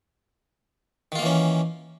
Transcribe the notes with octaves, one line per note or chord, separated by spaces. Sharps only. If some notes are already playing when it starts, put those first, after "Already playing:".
D#3 E3 A#3 C#4 F4